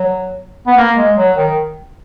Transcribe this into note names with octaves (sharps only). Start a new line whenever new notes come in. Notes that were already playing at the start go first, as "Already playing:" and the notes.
Already playing: F#3
B3
A#3
G#3
F#3
D#3